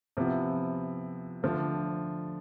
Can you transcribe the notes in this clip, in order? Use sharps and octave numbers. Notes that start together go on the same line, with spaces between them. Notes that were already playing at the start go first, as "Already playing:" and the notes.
C3 F3 B3 E4
D3 F3 A3